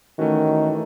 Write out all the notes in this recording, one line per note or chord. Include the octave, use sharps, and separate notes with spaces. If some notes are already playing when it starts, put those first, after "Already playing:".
D#3 E3 A3 C#4 F#4
E3 A3